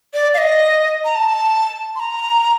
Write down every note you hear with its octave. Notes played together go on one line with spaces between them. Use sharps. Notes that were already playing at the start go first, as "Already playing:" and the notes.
D5
F5
D#5
A#5
A5
C6
A#5